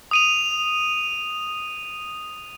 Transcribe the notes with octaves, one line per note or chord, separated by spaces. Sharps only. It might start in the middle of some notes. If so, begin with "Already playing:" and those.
D#6 D#7 F7